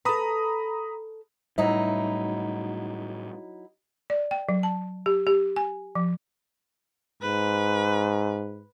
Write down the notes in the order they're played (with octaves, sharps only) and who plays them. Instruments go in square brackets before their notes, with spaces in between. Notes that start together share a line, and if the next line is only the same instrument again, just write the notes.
[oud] A4 B4 [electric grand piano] A#5 B5 D#6
[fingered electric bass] A2 G3 [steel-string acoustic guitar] F#3 D#4 E4
[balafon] D5
G5
F#3
A5
G4
G4
G#5
F3
[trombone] G#2 [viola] B4